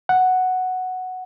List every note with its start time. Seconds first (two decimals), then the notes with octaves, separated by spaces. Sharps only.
0.09 F#5